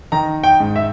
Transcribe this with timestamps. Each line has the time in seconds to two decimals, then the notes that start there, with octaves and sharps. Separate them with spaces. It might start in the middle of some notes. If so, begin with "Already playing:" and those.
0.12 D#3 A#5
0.44 G5
0.60 G#2
0.76 E5